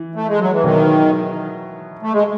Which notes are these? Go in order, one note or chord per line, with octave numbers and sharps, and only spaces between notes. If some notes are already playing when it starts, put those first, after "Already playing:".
Already playing: E3
A3
G#3
F#3
E3
B2 D#3 F#3 B3 E4 G#4
A3
G#3